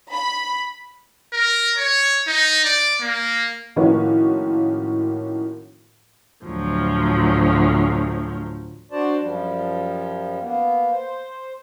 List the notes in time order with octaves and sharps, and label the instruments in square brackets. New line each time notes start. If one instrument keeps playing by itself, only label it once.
[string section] B5
[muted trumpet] A#4
C#5
D#4
D5
A#3
[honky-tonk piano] A2 D#3 F3 A#3 C#4 F#4
[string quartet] D2 A2 F3 F#3
[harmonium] D4 F#4 C5 D5 A5
F#2 F3 G3
A#3 B3
C5